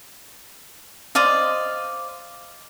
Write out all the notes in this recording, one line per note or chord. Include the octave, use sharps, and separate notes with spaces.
C5 D5 D#5 F5